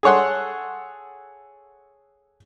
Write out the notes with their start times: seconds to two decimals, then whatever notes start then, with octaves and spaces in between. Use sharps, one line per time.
0.03 G#4 A4 C#5 F#5 C6